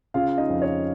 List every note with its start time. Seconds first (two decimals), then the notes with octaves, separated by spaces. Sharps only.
0.14 C#3 F4 F5
0.38 D#4 D#5
0.49 F2
0.62 C#5